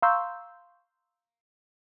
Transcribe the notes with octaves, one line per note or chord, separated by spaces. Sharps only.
F5 A#5 C6 C#6 E6 G6